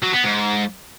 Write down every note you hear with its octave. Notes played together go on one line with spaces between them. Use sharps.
F#3
B3
G#2